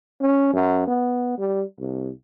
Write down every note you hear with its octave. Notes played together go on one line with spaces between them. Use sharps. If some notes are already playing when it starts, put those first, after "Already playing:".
C#4
F#2
B3
G3
C2